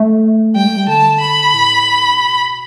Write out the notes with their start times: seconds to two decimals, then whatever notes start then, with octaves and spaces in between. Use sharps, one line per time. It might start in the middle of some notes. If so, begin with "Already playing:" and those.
Already playing: A3
0.56 G3 G5
0.66 A3
0.76 G3
0.88 D3 A5
1.20 B5
1.54 A2
2.18 B2